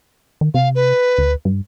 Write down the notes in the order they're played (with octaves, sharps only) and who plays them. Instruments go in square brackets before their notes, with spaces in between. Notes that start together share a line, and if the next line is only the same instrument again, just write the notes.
[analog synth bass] D#3
[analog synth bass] C3 [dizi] F5
[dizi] B4
[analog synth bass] D2
G2